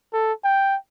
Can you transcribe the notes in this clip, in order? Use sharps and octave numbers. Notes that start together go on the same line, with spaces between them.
A4
G5